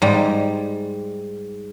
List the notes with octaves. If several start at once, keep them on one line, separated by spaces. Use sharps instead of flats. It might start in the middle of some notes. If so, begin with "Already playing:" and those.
G#2 G3 A#5